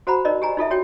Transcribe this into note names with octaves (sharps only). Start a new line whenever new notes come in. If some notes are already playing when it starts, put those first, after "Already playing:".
F#4 C5 F#5 A#5 B5
D#4 A#4 D5 D#5
G4 G#5 A#5
D#4 F4 A4 E5
F#4 C#5 G5